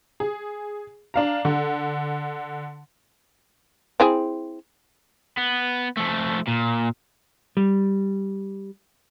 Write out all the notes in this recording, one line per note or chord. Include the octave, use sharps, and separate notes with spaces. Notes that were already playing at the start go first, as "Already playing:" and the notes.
G#4
D4 F5 A#5
D3
C4 E4 G#4
B3
F3 A3
A#2
G3